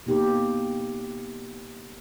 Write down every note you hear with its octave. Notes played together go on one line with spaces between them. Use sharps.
B2 A#3 D#4 G4